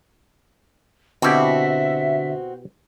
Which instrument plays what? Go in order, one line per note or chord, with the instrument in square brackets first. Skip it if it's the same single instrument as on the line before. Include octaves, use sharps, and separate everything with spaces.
[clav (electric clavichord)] B2 E4 G4 [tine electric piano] D3 D4 [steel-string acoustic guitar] C4 F#4 [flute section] E5